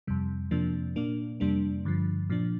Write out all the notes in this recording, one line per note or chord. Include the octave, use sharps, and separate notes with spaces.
F2 C3 G3
F2 C3 F3 A#3 D4
A#2 A#3 D4
F2 C3 G3 A#3 D4
G2 D3 F3
A#2 F3 D4